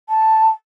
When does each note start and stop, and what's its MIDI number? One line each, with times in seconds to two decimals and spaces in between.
0.09 0.50 81